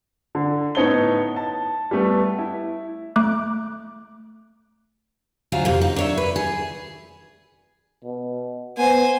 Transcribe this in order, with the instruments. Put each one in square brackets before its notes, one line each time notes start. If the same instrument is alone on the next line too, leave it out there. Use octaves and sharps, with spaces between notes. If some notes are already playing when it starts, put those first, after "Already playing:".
[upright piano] D3
A2 B3 D#4 C#5 A5 G7
A5
G3 A3 B3
E4
[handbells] A3 D6 F#6
[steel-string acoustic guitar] D2 F#3 F4 C5 G#5
F2 C3
D#4
D4 C#5 E5
B4
G#4
[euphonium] B2
[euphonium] B3 [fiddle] C5 G#5